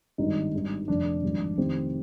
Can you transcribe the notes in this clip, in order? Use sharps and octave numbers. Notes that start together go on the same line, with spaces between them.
G#1 G2 D#3 D#4
G#1 G2 D#3
F1 F2 D3 D4
G#1 G2 F3
F1 F2 C3 D#3 C4